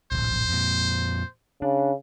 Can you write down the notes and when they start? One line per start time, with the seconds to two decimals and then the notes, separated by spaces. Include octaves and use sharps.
0.12 D1 A#1 C5
0.48 F2 A#2
1.62 C#3 D4